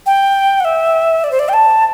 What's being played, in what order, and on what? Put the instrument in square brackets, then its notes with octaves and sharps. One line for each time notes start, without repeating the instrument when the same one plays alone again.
[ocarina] G5
F#5
E5
D5
C5
D5
G5
A5